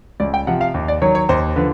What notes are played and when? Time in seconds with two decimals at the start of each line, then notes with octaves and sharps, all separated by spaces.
0.20 C#2 D5
0.34 G5
0.47 C3 F3 F#5
0.61 F5
0.74 D#2
0.88 D5
1.02 D#3 F#3 C#5
1.15 C#5
1.29 D#2 C5
1.56 D3 F3 B4